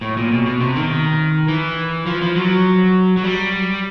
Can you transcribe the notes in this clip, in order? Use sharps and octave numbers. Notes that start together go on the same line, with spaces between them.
A2
A#2
B2
B2
C3
D#3
E3
F3
F3
F#3
F#3
G3